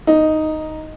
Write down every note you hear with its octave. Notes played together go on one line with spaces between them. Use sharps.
D#4